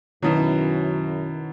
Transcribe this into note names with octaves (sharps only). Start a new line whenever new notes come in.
F#2 B2 D#3 F#3 C#4 E4